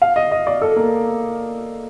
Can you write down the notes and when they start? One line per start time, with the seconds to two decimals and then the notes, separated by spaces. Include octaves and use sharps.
0.02 F5
0.16 D#5
0.31 D#5
0.47 D5
0.62 A4
0.76 A#3